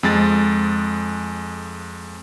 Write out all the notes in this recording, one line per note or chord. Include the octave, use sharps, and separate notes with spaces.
F2 G#3 A6